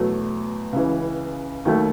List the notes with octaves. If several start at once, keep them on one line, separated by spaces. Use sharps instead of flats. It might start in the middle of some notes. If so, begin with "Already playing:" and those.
Already playing: E2 B2 F#3 A3
C#2 C#3 E3
D#2 D#3 F#3 A3